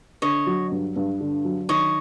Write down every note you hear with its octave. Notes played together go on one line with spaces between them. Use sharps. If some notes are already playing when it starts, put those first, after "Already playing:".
D3 C#5 D#5
F#3
G2
G2
D3
F#3
D#3 C#5 D#5